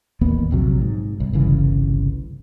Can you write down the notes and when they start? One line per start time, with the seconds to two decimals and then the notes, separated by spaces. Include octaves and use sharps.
0.21 A1 D#2 A#3 B3
0.51 A#1 C3 F#3
0.81 G#2
1.20 C2
1.33 G1 C2 C#3 E3